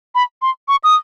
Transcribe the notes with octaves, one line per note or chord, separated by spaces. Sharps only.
B5
C6
C#6
D#6